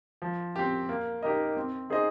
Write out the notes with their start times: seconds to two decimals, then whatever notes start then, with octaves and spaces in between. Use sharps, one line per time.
0.22 F3
0.56 C4 G4
0.89 A#3
1.23 D#4 G4 A#4 D#5
1.57 C4
1.90 D#4 G#4 C5 D#5